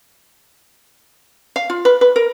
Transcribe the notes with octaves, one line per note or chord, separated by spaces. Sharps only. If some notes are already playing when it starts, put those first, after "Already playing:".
F5
F4
B4
B4
A#4